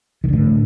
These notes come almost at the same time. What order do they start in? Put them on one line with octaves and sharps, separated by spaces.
D#3 D3 A2